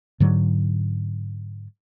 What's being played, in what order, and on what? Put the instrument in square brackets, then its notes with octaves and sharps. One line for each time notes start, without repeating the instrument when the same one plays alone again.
[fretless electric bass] G#2 D3 F#3